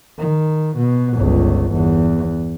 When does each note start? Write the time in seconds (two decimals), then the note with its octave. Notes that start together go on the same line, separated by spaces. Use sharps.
0.19 D#3
0.77 B2
1.15 G1 C#2
1.73 E2